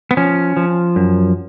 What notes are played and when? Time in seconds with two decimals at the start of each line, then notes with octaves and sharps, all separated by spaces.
0.11 B3
0.17 F3 C#4
0.57 F3
0.96 F#2